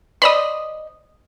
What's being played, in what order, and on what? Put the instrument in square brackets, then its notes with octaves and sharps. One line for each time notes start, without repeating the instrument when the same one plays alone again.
[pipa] C5 D5 D#5 [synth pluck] B5 D#6